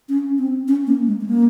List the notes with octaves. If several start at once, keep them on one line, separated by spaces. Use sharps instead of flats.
C#4
C4
C#4
A#3
G#3
G#3
A#3